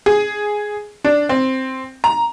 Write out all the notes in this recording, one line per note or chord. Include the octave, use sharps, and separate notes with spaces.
G#4
D4
C4
A#5